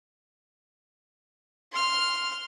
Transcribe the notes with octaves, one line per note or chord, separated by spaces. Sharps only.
C6 F6